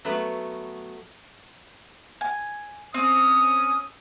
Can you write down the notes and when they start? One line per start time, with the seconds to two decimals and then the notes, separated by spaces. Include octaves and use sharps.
0.05 F#3 A3 B3 B4
2.21 G#5
2.94 C4 C#4 D#6